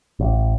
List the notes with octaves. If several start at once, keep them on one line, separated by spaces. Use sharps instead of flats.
A1